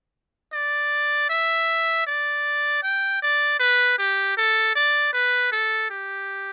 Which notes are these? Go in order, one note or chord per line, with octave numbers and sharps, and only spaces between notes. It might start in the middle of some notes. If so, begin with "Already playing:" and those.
D5
E5
D5
G5
D5
B4
G4
A4
D5
B4
A4
G4